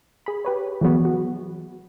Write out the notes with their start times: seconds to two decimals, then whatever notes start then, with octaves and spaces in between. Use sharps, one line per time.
0.26 G#4 B5
0.45 G4 B4 C#5
0.81 E3 F#3 G#3 B3 F#4
1.05 F#4